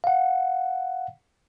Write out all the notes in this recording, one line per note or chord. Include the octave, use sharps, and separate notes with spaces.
F5 F#5